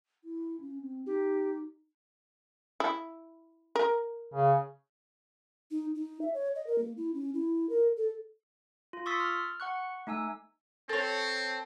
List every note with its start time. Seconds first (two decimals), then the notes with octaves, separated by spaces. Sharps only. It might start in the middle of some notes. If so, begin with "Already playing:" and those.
0.24 E4
0.60 C#4
0.81 C4
1.06 D#4 G4
2.80 E4
3.76 A#4
4.34 C#3
5.71 D#4
5.95 D#4
6.21 E5
6.34 C#5
6.55 D#5
6.67 A#4
6.78 A#3
6.97 E4
7.14 C#4
7.34 E4
7.69 A#4
7.97 A4
8.93 F4
9.06 C6 C#6 D#6 E6 A6 B6
9.20 F6
9.60 F#5 C#6 F#6
10.07 A3 D#4 G#5 E6
10.89 C4 A4 C#5